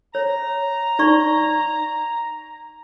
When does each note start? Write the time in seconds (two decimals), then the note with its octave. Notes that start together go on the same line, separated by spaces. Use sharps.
0.15 C#5 A#5
0.99 D#4 D5 C#6